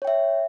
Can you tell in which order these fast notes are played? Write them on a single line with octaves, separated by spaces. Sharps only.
C#5 G5 E5